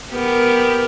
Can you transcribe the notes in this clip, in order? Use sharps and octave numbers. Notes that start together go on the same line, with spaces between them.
B3 G4 A#4